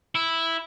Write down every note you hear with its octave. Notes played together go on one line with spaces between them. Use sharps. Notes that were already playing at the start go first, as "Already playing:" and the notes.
E4